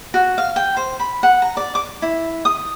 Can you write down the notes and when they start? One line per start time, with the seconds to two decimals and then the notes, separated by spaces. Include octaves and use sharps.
0.14 F#4
0.38 F5
0.56 G5
0.77 C5
1.00 B5
1.23 F#5
1.42 A#5
1.57 D5
1.75 D6
2.02 E4
2.45 D#6